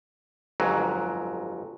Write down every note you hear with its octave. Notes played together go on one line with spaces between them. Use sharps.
G1 F2 G#2 F#3